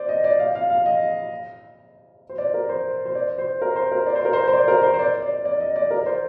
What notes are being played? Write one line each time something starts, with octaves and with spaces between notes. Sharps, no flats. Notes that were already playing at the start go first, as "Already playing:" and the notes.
Already playing: C5 D5
D#5
D5
F5
F5
F5
D#5
C5
D5
A#4
C5
C5
D5
C5
A#4
C5
A#4
D5
C5
A#4
C5
C5
D5
A#4
C5
C5
D5
D5
D5
D#5
D5
A#4
D5
C5